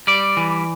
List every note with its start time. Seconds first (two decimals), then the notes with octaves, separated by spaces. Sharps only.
0.07 G3 D5
0.37 E3